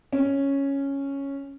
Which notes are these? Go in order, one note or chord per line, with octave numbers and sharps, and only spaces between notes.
C#4